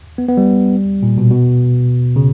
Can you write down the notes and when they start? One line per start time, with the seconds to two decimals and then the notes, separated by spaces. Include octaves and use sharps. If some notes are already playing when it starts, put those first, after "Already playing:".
0.18 B3
0.28 B3
0.37 G3
1.03 A#2
1.18 B2
1.31 B2
2.16 C#3